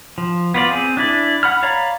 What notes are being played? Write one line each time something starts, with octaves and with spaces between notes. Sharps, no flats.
F3
B3 F4 D5
C4 G#4
D4 E4 D5
F#5 B5 F6
C#5 D5 F5 A#5 B5